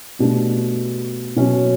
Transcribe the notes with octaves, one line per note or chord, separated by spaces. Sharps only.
B2 A3 D4 G4
B2 F#3 C#4